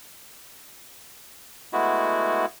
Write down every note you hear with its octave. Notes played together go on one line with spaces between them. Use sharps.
G#3 A3 B3 E4 F#4